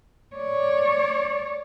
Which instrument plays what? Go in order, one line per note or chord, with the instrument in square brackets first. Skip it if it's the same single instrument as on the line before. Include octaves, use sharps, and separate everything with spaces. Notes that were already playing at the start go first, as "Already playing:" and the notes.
[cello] C#5 D5